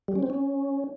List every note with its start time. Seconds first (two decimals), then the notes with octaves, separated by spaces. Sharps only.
0.08 G3
0.15 C#4
0.23 C4
0.30 C#4